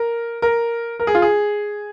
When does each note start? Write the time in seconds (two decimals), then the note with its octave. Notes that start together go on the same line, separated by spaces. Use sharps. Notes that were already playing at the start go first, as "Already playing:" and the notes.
Already playing: A#4
0.42 A#4
1.00 A#4
1.07 G#4
1.15 F4
1.22 G#4